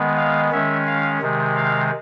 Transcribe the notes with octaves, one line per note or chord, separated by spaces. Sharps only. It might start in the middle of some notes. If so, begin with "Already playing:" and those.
Already playing: D#3 G#3 B3
F5
D#3 G#3 C#4 E5
F5
C3 D#3 G#3
F5